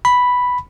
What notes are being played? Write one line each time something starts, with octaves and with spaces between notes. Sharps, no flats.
B5